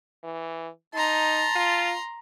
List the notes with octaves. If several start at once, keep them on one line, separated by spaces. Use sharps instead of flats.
E3
D#4 A5 A#5 C6
F4